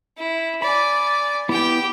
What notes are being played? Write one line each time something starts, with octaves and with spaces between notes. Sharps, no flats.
E4
D5 G#5 B5
B3 E4 G4 G5